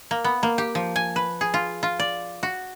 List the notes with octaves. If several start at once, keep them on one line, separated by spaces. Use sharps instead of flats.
A#3
B3
A#3
G4
F3
G#5
B4
G#4
F4
F4
D5
F#4